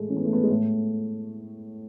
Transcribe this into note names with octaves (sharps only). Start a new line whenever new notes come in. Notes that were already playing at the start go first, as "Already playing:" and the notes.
Already playing: A2 G#3 A3
E3 C#4
B3
A3
B3
G#3
A2 A3